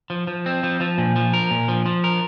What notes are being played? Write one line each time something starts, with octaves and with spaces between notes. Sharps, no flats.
F3
F3
C4
F3
F3
A#2
F3
A#4
A#2
F3
F3
A#4